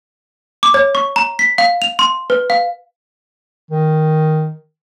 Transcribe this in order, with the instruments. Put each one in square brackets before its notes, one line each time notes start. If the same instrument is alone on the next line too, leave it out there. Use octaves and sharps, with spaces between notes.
[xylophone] D6
C#5
C#6
A#5
B6
F5
F7
C6
B4
F5
[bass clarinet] D#3